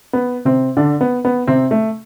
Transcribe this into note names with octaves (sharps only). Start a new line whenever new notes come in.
B3
C3 C4
D3 D4
B3
B3
C3 C4
A3